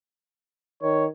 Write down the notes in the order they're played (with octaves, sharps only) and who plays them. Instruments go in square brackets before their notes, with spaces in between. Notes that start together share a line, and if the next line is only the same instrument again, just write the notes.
[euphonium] D#3 [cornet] C#5